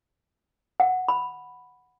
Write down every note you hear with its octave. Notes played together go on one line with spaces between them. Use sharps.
F#5
B5